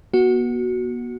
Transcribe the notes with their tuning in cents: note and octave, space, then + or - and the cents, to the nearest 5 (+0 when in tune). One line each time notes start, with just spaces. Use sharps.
B3 -40 F#4 +0